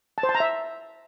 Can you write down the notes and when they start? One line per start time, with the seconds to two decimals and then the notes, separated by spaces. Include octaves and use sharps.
0.18 A5
0.23 C5
0.29 A5
0.35 A#5
0.40 E5